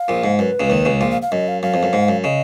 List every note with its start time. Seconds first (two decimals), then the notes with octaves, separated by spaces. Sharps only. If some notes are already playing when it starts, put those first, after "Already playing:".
Already playing: F5
0.08 A#1 A#2
0.24 G#2
0.39 F#2 B4
0.60 C#2 C#3
0.70 D#2 D#3
0.85 C#2 C#3
1.01 A#1 A#2 F5
1.11 F5
1.22 F5
1.32 F#2 D#5
1.48 F5
1.62 F#2 F5
1.74 F2
1.83 F#2
1.93 G#2
2.08 F#2
2.24 C#3 D#5